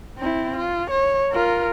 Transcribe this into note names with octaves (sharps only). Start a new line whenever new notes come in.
C4 E4
F4
C#5
F4 A#4